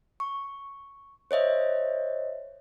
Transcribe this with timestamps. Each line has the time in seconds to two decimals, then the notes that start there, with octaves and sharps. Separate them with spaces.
0.20 C#6
1.31 C5 C#5 D#5 E5